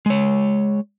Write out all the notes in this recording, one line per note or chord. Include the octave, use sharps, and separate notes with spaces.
G#3 C#5